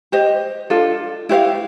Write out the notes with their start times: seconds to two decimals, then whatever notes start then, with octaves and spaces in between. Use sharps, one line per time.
0.12 G4 C5 D#5
0.70 D4 F4 A4
1.29 E4 G4 C5 F5